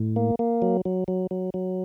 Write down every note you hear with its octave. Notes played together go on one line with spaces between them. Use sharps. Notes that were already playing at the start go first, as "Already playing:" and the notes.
Already playing: A2
A#3
A#3
F#3
F#3
F#3
F#3
F#3